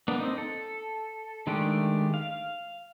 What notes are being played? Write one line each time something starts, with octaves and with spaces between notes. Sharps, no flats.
A#3 B3 D4
C4 D#4
A4
D#3 G#3 A3 D4 G4
F5